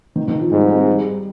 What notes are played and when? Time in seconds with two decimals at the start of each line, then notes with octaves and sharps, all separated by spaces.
0.16 D#3
0.28 D#3
0.40 F3
0.51 G#2 G3
0.61 G#3
0.69 C4
0.78 G#3
0.87 G3